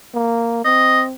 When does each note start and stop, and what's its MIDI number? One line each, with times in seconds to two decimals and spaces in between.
0.14 0.61 58
0.65 1.15 60
0.65 1.02 75